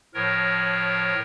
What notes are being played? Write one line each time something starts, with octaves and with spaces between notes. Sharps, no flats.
A2 F3 A#4 C#5